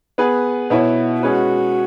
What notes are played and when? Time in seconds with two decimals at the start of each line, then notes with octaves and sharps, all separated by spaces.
0.18 B3 G#4 B4
0.70 B2 B3 E4 C#5
1.22 G#3 C#4 F#4 G#4 B4